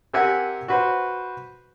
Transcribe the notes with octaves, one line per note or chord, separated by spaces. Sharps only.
C4 G4 A#4 E5 F#5 G#5
F#4 B4 C5